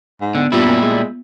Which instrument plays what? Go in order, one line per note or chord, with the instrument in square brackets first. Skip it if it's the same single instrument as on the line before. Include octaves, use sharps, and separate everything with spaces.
[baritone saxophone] G#2
[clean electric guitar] D3 [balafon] B3
[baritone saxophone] G2 [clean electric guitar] A#2 G3 E4 [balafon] B3 F4
[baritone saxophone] F#2 [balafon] A#3 B3
[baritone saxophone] G#3